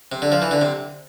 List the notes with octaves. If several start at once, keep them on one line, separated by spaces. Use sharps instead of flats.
C3
D3
F3
E3
D3
C3